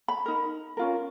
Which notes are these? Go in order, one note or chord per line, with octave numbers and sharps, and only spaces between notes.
B5
D#4 A#4
C#4 F4 A#4